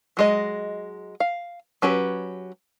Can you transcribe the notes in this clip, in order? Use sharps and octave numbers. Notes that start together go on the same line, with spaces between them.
F#3 G#3 D#5
F5
F#3 C#4 G4 B4